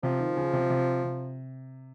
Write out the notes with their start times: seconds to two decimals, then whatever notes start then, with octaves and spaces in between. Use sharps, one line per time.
0.03 C3 F3
0.20 D#3
0.37 C#3
0.53 C3
0.70 C3
1.04 C3